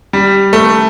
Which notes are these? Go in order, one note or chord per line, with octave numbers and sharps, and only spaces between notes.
G3
A3